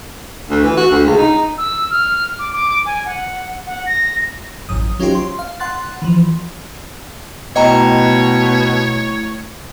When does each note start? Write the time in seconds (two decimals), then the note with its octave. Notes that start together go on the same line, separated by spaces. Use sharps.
0.50 D2
0.64 E3
0.77 F#4
0.91 D2
1.06 C#2
1.18 D#4
1.58 E6
1.91 F6
2.39 D6
2.53 D6
2.86 G#5
3.06 F#5
3.67 F#5
3.86 A#6
4.69 A1 F#2 D#6
5.00 F#3 C#4 D#4 F4 G4 C5
5.15 C6
5.39 F5
5.60 F#5 C6 F#6 A6
6.02 E3 F3
7.56 B2 A3 E4 C#5 D#5 G5 A#5